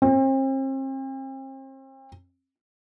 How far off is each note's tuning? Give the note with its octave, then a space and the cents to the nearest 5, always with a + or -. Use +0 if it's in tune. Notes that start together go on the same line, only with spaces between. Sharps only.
C4 +40